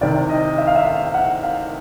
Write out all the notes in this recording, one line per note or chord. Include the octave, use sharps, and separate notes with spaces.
C2 C3 D#3 D5
D#5
E5
F5
E5
F5
F#5
F5